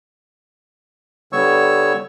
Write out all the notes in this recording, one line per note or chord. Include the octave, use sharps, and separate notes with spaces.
D3 G3 B3 C#5 C#6 E6